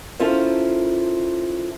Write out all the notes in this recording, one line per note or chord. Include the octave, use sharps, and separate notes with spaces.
C#4 E4 F4 A4 A#4 C5